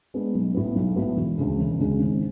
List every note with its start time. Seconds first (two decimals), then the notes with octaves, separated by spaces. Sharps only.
0.14 G#3 B3 D4
0.34 B1
0.54 A2 F#3 B3
0.76 B1
0.96 A2 F#3 B3
1.16 E1
1.38 D2 C#3 G#3
1.59 E1
1.78 D2 C#3 G#3
1.99 G#1